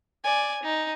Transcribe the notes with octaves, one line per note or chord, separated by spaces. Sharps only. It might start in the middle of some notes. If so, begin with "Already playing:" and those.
D5 G#5
D#4